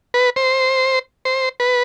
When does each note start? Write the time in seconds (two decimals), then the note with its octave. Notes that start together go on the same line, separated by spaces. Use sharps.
0.14 B4
0.36 C5
1.25 C5
1.60 B4